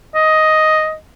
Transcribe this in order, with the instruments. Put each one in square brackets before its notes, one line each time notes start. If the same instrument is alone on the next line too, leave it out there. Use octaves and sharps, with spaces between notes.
[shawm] D#5